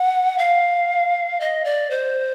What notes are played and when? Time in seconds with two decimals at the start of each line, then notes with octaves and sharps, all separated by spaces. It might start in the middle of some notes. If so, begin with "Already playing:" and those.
Already playing: F#5
0.38 F5
1.40 D#5
1.65 D5
1.91 C5